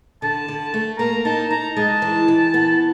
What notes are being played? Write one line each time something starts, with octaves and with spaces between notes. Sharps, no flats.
D3 A5
D3
A3
A#3 A#5
D#4 A5
D#4 A#5
G#3 A5
E3
E3
B3